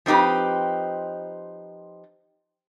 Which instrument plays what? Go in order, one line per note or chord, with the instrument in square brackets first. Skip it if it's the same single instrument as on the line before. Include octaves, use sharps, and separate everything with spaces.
[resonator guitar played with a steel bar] F3 C4 D#4 G4 B4